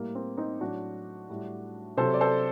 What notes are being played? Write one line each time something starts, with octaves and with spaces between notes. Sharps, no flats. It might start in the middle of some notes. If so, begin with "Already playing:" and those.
Already playing: A2 G3 A#3
C4
C4 D#4
A2 F#3 D4 F#4
A2 G3
C3 F#3 A4 C5
D5
A4 C5